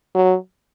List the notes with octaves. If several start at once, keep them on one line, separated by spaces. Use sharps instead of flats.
F#3